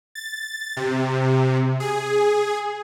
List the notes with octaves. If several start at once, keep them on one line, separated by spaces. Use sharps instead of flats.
A6
C3
G#4